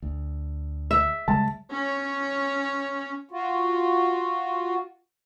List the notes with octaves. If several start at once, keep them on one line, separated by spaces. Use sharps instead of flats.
D2
E5
C#3 G3 G#3 A5
C#4 C#5
F4 F#4